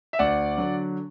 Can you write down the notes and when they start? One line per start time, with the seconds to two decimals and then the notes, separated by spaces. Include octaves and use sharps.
0.13 E5
0.19 D2 D5 F#5
0.58 D3 F#3